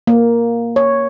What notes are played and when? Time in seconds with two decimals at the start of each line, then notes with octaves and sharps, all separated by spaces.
0.07 A#3
0.76 C#5